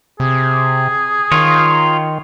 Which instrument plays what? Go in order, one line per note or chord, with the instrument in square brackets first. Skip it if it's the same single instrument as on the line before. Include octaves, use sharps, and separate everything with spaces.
[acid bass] C3 [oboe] G#4
[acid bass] D#3 [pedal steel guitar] F4 C#5